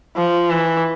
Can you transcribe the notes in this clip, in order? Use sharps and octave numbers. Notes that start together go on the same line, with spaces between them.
F3
E3